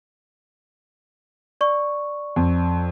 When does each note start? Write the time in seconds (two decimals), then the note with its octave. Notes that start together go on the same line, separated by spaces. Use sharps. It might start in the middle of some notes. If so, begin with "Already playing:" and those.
1.61 D5 C#6
2.36 F2